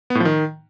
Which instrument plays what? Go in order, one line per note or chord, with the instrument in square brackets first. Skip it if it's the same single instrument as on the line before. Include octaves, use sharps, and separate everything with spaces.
[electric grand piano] B3
A2
F3
D#3